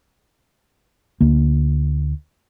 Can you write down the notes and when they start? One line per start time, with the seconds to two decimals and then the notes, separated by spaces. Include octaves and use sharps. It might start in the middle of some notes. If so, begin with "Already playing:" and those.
1.21 D2 A#3